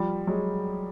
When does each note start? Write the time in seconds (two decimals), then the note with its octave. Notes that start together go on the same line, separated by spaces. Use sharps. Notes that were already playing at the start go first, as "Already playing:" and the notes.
Already playing: F3 G3
0.27 F#3 G#3